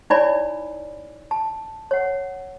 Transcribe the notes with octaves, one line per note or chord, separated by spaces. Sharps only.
D#4 E4 C#5 D5 G#5 B5
A5
C#5 F#5